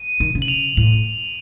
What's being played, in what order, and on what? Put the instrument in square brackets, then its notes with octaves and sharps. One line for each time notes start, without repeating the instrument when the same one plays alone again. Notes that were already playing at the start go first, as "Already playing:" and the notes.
Already playing: [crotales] D#7
[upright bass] D#3
C#3
[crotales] F#7
F7
[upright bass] A2 [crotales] F7